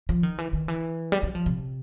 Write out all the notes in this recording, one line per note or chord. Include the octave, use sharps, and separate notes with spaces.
F3
D#3
E3
D#3
E3
G3
F#3
F3
C3